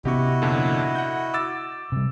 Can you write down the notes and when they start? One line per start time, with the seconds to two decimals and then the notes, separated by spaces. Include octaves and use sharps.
0.05 C3 B3 C#4 E4 F#4 G4 D#5 C#6
0.42 F2 A#2 D3
0.95 F#5 G6
1.34 D6 E6 A6
1.92 C3 G3